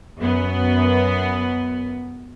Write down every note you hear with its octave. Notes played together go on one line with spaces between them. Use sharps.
F#2 B3